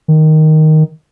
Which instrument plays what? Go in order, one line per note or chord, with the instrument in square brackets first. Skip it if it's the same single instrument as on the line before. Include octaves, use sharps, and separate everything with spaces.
[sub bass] D#3